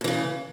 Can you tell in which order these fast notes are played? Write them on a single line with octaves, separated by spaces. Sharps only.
A2 E3 C#3